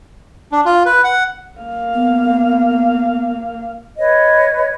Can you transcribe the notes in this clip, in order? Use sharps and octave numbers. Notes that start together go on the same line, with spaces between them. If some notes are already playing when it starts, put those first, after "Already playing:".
D4
F4
B4
F#5
A#3 F5
B3
B4 C#5 D#5